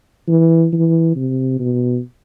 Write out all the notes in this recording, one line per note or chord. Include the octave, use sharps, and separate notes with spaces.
E3
E3
C3
B2